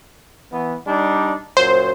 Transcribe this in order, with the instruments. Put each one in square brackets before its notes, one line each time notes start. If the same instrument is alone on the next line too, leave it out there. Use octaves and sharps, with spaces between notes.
[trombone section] E3 B3
G3 D4 D#4
[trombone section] F#2 A#2 F#3 [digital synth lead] C5